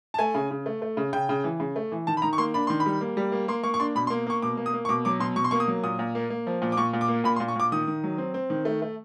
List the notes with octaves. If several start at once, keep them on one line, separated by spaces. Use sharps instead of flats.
A5
A3 G#5
C#3
C#3
A3
A3
C#3
C#3 G5
C#3
E3
C#3
A3
E3
D#3 A5
B5
D#3 A#5
C#6
A#3 C6
D4 B5
D#3 C6
B5
G3
A#3
G3
A#3
A#3 C6
A#3 C#6
C#6
D4 C6
B2 B5
C6
A#3
A#3 C#6
B2 D6
A#3
D#6
A#3
C#6
B2 D6
F#3 D6
B2 C6
B2 C#6
C6
A#3 C#6
D#6
F#3
A#2 D#6
A#2
A#3
A#3
F3
A#2
D6
A#2 C#6
A#2
D6
A#3
A#2 B5
C6
A#2
C#6
A#2 D6
D#3 D#6
D#3
F#3
C4
C4
D#3
A3
A3